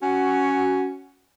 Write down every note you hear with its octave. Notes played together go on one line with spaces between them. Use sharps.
C#4 F#4